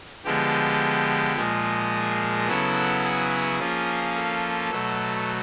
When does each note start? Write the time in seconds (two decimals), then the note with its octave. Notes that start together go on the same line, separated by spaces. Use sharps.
0.25 D3 F3 G#3 B3 G4
1.36 A#2 F3 G#3 G#4
2.47 C#3 F#3 B3 E4 A4
3.04 G#4
3.60 F3 A#3 C#4 F4
4.15 A4
4.70 B2 F#3 A3